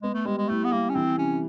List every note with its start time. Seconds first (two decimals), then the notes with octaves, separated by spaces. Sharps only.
0.03 G#3 B3
0.14 A3
0.25 G3 G#3
0.38 G#3
0.49 A3 E4
0.64 B3
0.72 G3 A#3
0.90 C#4
0.95 E3 C4
1.18 C3 C#4